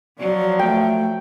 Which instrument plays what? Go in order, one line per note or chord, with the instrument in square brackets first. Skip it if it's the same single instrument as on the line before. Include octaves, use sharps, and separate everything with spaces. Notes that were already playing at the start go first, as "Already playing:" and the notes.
[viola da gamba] F3 F#3 [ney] D5
[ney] A3 [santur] G5